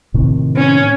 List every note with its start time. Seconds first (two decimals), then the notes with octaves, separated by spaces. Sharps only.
0.14 A2 C3 D#3
0.57 C#4